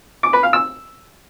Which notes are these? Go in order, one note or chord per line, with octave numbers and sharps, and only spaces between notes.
D6
B4
F5
E6